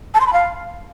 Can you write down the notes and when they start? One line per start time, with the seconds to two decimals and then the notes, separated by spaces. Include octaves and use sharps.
0.14 A5
0.20 C6
0.27 B5
0.33 F5